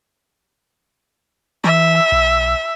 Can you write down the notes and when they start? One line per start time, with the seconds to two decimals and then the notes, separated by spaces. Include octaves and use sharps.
1.64 E3 E5
2.12 B1